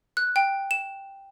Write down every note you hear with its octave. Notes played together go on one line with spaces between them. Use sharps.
F#6
G5
E7